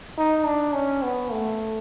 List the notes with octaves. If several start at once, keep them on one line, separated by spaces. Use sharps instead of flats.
D#4
D4
C#4
B3
A3